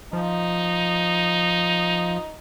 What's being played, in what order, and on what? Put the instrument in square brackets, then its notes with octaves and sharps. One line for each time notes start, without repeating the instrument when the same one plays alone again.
[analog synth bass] F3 [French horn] D#4